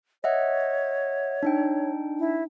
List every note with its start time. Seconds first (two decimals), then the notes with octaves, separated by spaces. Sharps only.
0.24 C#5 D#5 E5 F#5
1.43 D4 D#4 G5
2.19 E4